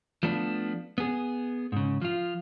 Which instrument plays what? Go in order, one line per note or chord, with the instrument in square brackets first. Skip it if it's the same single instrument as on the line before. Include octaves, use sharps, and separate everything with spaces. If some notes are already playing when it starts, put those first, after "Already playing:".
[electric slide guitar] F3 A3 B3 D4
B3 G#4
G#2 C#3
F3 F4